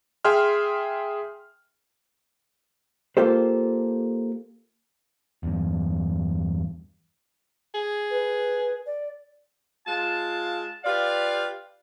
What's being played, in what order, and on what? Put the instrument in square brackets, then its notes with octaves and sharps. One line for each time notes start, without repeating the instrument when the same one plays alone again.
[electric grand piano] G#4 E5 G5 C6 F6
[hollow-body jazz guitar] A#3 F4 G4 A4 C5
[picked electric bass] E2 G2
[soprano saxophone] G#4
[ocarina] B4
D5
[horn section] G#3 F4 A5
F4 G4 B4 D5 F5